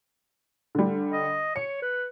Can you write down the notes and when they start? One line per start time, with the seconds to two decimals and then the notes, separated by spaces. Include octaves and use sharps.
0.75 D3 G3
1.13 D#5
1.56 C#5 C#7
1.82 B4